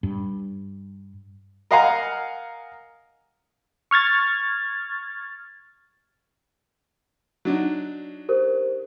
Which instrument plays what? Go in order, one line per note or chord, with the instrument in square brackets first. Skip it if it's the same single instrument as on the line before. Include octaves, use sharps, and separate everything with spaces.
[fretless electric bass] G2
[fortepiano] A#4 D#5 F5 F#5 G#5 A#5
[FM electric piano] C#6 F6 G#6 A6
[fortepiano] F#3 D4 D#4
[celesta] G4 A#4 C5